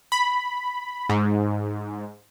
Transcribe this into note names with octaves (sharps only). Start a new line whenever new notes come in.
B5
G#2